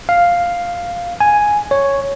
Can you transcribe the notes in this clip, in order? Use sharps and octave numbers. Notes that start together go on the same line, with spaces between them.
F5
G#5
C#5